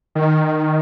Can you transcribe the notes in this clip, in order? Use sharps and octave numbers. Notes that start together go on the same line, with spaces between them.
D#3